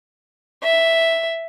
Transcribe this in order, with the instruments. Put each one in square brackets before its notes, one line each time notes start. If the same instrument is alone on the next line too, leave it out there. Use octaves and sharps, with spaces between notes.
[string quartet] E5